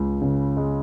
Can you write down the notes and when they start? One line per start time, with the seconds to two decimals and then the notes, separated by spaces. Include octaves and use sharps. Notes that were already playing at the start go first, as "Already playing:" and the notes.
Already playing: C#2 C#3
0.22 C#3
0.57 G#3